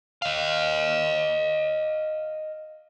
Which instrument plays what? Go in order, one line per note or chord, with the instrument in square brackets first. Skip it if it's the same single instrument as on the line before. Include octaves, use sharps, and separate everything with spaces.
[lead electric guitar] D#5 F5